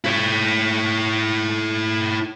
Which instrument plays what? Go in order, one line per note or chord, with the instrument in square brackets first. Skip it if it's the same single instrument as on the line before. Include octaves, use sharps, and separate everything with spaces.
[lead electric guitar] E4 C#5